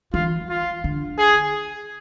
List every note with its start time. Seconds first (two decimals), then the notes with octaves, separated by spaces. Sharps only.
0.14 E3 F4
0.50 F4
0.84 D3
1.18 G#4